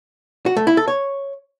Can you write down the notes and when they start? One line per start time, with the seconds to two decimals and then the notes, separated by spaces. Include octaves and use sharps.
0.46 F#4
0.57 A3
0.67 E4
0.77 A4
0.88 C#5